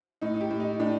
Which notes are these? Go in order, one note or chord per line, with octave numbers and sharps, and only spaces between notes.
A2 D#4
G4
A2
D#4
A2 D4